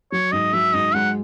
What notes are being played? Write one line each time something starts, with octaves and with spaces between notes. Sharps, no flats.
F#3 C#5
G#2 D#5
F#3 E5
G#2 D#5
G#3 F#5